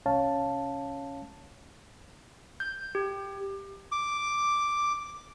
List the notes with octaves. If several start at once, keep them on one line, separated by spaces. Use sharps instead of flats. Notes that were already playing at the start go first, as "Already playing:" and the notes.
C2 C#4 C#5 F5 A5
G6
G4
D6